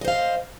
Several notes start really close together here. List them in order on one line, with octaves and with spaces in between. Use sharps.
D#5 C5 F5